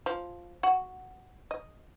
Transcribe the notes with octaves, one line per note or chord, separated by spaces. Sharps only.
F3
F#4
D#5